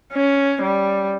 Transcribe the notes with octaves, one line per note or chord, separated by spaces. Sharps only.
C#4
G3